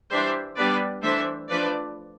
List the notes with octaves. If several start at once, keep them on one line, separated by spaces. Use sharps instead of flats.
E3 G3 D4 C5 E5
G3 B3 D4 B4 D5
E3 A3 D4 C5 E5
F3 A3 D4 B4 D5